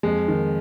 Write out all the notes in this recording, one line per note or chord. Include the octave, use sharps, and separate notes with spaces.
F2 G#3
D#3